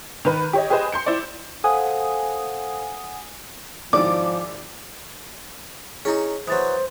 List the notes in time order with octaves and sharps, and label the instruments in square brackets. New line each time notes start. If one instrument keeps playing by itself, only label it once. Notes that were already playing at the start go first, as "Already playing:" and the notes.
[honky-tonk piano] D#3 B4
G4 C#5 D#5
G4 G#4 B4 C5 D#5
C6 G6 C#7
E4 C5 D5
[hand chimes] A4 C5 F5 [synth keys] F#5 G#5 D#6
[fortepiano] G#1 D#3 E4 [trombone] F3 [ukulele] D5 [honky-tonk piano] D6
[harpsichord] C#4 D#4 [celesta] E4 G#4
[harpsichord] E3 F#3 [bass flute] C5 [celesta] D#6 A6